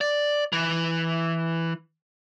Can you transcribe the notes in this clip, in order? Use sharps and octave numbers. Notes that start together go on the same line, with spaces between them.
D5
E3